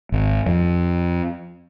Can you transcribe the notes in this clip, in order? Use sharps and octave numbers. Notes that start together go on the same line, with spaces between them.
G#1
F2